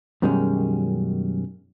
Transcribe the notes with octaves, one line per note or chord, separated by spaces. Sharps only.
F#2 B2 D#3 G3 G#3 C#4